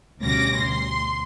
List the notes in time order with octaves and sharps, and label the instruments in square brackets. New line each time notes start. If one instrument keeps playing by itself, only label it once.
[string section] D2 G2 B2 C#4 D6 A#6
D2 C6